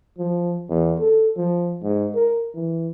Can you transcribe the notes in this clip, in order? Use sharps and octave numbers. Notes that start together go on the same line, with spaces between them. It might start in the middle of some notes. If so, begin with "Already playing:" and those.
F3
E2
A4
F3
G#2
A#4
E3